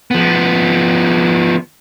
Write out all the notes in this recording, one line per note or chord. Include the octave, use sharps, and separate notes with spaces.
F3 B3